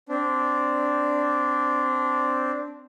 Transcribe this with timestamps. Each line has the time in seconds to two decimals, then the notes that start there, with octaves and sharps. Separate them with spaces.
0.09 C4 D4